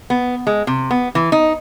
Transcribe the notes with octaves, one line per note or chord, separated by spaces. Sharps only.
B3
G#3
C3
B3
E3
D#4